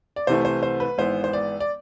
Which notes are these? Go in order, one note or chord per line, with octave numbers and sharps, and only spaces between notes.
D5
C2 C3 E3 A3 C5
C5
C5
B4
G#1 G#2 E3 B3 E4 C5
C5
D5
D5